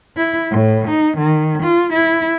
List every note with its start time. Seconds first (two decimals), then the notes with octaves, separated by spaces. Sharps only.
0.17 E4
0.51 A2
0.88 D#4
1.18 D#3
1.63 F4
1.93 E4